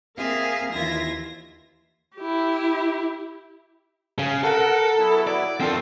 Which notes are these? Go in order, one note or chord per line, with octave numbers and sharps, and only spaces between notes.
A#3 C4 G#4 A#4 E5 F5
D#2 E3 F4 E5 G#6 A#6
E4 G4
C#3
A4 A#4 F#5
F#3 B3 E4
D5
D3 D#3 C4 F4 A4